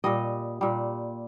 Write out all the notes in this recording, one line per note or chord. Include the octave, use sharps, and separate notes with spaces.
A#2 G3 D#5
A#2 G3